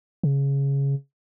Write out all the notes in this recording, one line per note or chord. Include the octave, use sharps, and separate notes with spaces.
C#3